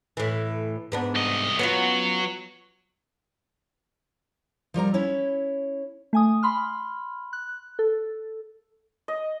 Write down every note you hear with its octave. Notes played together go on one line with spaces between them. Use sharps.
A2 E3
G#2 B3 D4
C2 D#5
F#3 B3 C#4 F4
F3 G3 A#4 A#5
C#4 E4 C#5
A3 G#5 D#6
B5 C6 F6
F#6
A4
D#5